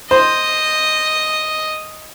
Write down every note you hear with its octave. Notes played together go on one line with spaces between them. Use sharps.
C5 D#5